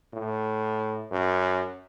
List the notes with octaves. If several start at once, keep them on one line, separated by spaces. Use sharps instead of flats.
A2
F#2